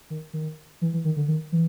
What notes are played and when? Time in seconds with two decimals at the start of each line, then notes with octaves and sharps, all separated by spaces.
0.10 D#3
0.33 D#3
0.82 E3
0.93 E3
1.05 D#3
1.16 D3
1.28 D#3
1.52 E3